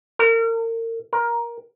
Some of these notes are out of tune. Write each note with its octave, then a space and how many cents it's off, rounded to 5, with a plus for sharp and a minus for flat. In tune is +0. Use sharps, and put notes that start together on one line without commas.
A#4 -35
A#4 +15